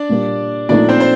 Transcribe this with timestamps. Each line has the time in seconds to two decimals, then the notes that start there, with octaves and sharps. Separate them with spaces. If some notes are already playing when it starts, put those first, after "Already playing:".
Already playing: D4 D5
0.09 A#2 G3 A#3
0.69 A#2 F3 A3 D4 D#4 D5
0.89 C4 C5
1.00 C5